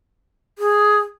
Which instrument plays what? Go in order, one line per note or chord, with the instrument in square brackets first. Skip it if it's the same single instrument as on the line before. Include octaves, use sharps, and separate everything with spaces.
[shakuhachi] G#4